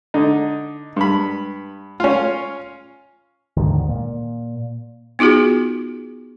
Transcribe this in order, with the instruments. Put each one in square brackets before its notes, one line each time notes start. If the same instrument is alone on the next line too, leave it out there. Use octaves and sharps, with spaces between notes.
[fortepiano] D3 D#4
G2 B5
C#4 F4
[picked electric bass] D#2 G#2 D3 D#3
A#2
[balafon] B3 D#4 F4 F#4 G#4